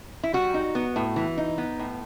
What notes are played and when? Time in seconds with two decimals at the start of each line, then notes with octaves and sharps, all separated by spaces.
0.23 E4
0.33 G3 F#4
0.54 D#4
0.75 B3
0.96 A2
1.16 E3
1.37 D#4
1.58 B3
1.79 A2